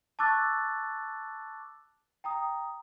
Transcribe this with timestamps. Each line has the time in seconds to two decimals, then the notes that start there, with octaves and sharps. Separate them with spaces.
0.19 A5 C#6 D6 E6 F#6 A6
2.24 G5 A#5 D#6